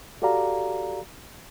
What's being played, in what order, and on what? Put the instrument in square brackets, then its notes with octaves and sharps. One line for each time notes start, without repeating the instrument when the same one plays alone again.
[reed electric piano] F#4 G4 A4 D5 F5 A#5